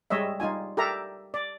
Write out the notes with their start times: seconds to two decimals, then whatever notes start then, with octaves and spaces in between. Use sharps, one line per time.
0.10 G3 G#3 C#5 D#5 E5
0.40 G3 D#4 F4 G#5
0.77 G4 A4 A#4 D5 E5 A#5
1.34 D5